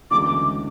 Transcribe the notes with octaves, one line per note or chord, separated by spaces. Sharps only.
D2 C#3 E3 G#3 D6